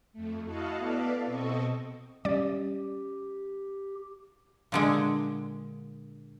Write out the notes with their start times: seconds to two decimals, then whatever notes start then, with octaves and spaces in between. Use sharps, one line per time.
0.13 F2 A3
0.44 E4 F#4 D#5 F5 F#5 A5
0.77 B3 E4 A4 B4 D5 F5
1.25 B2 C4 A4 D#5 C#6
2.25 G3 C#4 G4 D5
4.72 A#2 D3 G#3